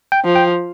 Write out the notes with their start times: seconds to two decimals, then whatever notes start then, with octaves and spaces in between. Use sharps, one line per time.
0.12 G5
0.24 F3
0.35 G5